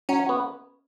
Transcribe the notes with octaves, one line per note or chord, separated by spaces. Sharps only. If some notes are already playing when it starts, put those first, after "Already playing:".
F#3 C#4
B3 F#4